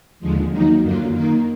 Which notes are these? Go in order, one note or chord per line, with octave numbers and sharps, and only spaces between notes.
D#2 D3 F3 G#3
D#3 F#3 A#3 D#4
F#2 D3 F#3 A#3 F4
D#3 A#3 D#4